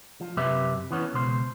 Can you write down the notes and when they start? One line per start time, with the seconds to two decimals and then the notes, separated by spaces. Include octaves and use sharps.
0.21 F3
0.37 F#2 C3 C4 G4 B4 E5
0.91 E3 B3 C#4
1.13 C#2 B2 C5